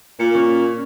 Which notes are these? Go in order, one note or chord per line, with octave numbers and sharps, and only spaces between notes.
A#2 C#7
C#4